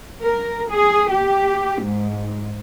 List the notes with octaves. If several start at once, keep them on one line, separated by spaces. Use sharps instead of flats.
A#4
G#4
G4
G#2